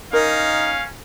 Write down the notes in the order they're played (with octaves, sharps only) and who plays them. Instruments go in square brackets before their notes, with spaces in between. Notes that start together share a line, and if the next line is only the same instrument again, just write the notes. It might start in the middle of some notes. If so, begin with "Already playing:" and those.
[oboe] C#4 [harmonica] D#4 [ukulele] A#4 [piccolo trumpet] F5